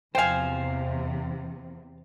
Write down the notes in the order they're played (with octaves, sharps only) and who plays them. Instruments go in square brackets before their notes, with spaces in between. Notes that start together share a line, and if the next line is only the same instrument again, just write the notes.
[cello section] E2 C3 [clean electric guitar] C5 F5 [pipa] G5 G#5